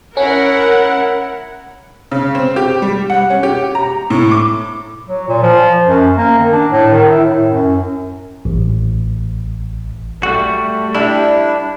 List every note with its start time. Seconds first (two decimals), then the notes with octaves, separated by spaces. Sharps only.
0.17 C#4 E4 A#4 F#5
2.11 C#3
2.35 C4
2.56 G4
2.82 G3
3.10 F#5
3.30 C#4
3.43 G4
3.75 A#5
4.10 A2
4.31 D6
5.08 F#3
5.28 A#2
5.42 F3
5.87 F#2
6.18 A#3
6.39 D#3
6.52 D4
6.71 A2
6.92 D#3
7.10 E4
7.25 A2
7.50 F#2
8.45 A1
10.23 G3 A3 F#4
10.95 G3 D4 E4